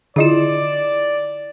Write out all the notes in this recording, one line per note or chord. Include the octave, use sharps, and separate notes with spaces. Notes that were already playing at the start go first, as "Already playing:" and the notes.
D3 E4 F4 G#4 D5 D#5 E7